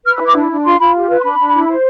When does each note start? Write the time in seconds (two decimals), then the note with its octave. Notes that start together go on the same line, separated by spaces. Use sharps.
0.05 B4 F6
0.16 E6
0.20 E4
0.26 D6
0.35 D4
0.51 D4
0.65 F4 C6
0.80 F4 B5
0.95 G4
1.09 B4
1.19 C6
1.24 D4 B5
1.39 D4
1.54 E4
1.69 C5